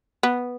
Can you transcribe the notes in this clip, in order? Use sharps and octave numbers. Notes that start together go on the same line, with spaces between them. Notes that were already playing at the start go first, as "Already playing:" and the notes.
B3